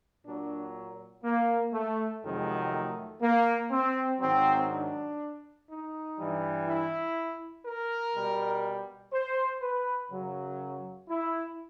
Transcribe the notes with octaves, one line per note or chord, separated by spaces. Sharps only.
A#2 F#3 D4
A#3
A3
F2 C3 D#3 F#3 G#3
A3
A#3
C4
G#2 D#3 F#3 C4
D4
D#4
G2 E3 G3
E4
A#4
B2 G3
C5
B4
F#2 C#3 F#3
E4